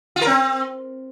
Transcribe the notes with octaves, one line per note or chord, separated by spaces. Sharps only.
F4
A#4
C4